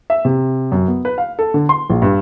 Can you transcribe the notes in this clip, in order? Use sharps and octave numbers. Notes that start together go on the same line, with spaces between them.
E5
C3
F#2
B3
B4
F5
A4
D3
C6
A#1
G2